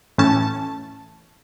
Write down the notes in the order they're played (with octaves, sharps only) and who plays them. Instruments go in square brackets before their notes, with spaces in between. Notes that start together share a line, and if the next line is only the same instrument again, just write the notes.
[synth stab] A2 E3 A3 C#4 A5